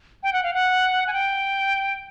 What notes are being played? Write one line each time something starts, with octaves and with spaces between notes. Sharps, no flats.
G5
F#5
F5
F#5
G#5
G5